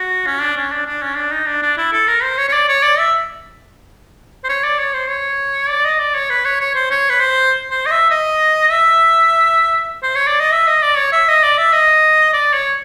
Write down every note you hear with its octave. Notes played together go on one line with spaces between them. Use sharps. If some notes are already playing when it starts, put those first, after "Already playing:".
Already playing: F#4
C#4
D4
C#4
D4
D4
C#4
D4
D#4
D4
D4
E4
A4
A#4
C5
C#5
C#5
D5
C#5
D5
E5
C5
C#5
D5
C#5
C5
C#5
D5
D#5
D5
C#5
B4
C#5
C#5
C5
C#5
B4
C5
C5
D#5
E5
D#5
E5
C5
C#5
D5
D#5
E5
D#5
D5
C#5
E5
D#5
D5
E5
D#5
D5
C#5